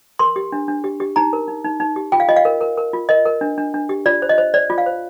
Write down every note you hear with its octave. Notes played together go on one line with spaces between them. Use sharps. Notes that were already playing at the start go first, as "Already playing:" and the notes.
A#4 C6
G4
D4
D4
G4
G4
D#4 A#5
A#4
D#4
D#4
D#4
G4
F4 G5
F5
F4 D#5
F5
A#4
A#4
A#4
F4
A#4 D#5
A#4
D4
D4
D4
G4
F4 D5
C5
D#5
C5
C5 D5
F4
F5
C5